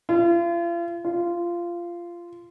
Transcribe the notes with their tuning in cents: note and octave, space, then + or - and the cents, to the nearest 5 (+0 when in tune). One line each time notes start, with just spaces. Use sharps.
F4 -40
F4 -15